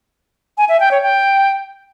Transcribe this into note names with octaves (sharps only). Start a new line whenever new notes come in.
G#5
E5
G5
C#5
G5